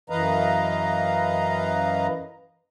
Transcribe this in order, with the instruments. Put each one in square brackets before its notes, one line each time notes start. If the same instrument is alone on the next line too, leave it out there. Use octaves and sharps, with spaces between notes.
[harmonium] F#2 E3 B4 D#5 F5 A#5